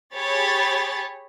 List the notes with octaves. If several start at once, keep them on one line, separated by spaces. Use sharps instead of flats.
G4 G#4 C#5 B5 A6